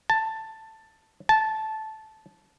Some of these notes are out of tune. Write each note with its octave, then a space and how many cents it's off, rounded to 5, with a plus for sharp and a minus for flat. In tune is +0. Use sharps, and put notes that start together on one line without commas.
A5 +10
A5 -10